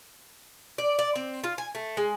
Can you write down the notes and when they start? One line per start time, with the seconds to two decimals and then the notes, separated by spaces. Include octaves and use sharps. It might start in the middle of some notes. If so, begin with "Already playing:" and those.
0.78 D5
0.99 D5
1.16 C4
1.44 F4
1.58 G#5
1.75 A3
1.97 G#3